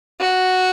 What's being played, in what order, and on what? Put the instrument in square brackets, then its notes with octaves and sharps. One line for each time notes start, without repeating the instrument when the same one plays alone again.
[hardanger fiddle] F#4